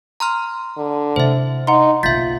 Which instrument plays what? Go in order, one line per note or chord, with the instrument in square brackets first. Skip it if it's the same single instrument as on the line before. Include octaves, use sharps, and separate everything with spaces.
[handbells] A#5 C6 F6
[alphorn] D3
[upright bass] C3 E4 [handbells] C5 E5
[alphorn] D#4 [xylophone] F#5 A#5 C6
[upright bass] F#1 B1 [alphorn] F4 [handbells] E5 B6 [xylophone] G6 A6